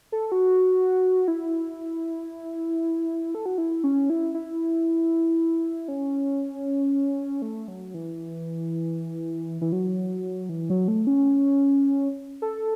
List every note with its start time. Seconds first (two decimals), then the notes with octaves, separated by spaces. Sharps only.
0.12 A4
0.32 F#4
1.28 E4
3.35 A4
3.46 F#4
3.58 E4
3.84 C#4
4.10 E4
4.34 E4
5.88 C#4
7.42 A3
7.68 F#3
7.94 E3
9.61 E3
9.72 F#3
10.49 E3
10.70 F#3
10.88 A3
11.07 C#4
12.42 A4